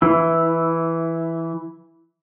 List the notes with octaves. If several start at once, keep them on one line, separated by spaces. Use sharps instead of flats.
E3 E4